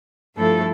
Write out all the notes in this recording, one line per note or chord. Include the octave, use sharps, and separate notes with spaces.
G2 F3 A3 E4 A4